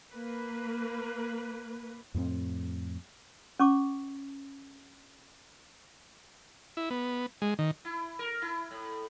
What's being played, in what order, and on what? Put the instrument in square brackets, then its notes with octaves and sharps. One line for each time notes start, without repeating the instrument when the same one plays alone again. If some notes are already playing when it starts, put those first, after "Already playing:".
[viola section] A#3 B4
[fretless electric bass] F2 A2 A3 C4
[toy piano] C#4 C#6 D6
[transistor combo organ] E4
B3
G#3
D#3
[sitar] E4
A#4
E4
A2